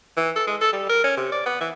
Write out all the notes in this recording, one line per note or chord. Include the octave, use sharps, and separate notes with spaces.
E3
A4
G#3
A4
G3
A#4
C#4
C3
D5
B3
E3